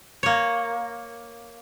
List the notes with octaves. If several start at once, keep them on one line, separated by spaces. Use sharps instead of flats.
A#3 C#5